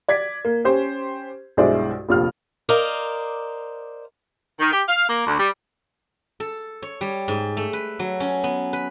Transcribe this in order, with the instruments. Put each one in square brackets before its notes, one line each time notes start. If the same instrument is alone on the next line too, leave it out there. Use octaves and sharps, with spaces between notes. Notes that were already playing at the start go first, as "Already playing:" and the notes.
[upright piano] D5 G#6 B6
A#3
C#4 G4 C5
B1 G2 G#3 E4 C5 D5
F1 A#1 F4 G4 F6
[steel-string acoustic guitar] A#4 C5 D5 D#5 F5
[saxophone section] D#3
G4
F5
A#3
D2
G3
[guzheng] A4
C#5
G3
G#2
A3
B4
F#3
C#4
B3
B4